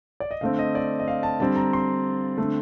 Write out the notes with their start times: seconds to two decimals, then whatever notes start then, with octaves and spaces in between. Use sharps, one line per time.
0.20 D5
0.31 D#5
0.41 D3 A3 C4 F5
0.59 D#5
0.75 D5
0.99 D#5
1.08 F5
1.23 A5
1.40 D3 G3 C4 A5
1.56 A#5
1.73 C6
2.38 D3 A3 C4